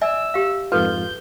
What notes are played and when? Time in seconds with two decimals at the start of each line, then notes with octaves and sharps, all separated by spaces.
0.01 D5 E5 G#5 E6
0.34 G4 F5
0.72 F2 G#2 F4 A4 B4 G6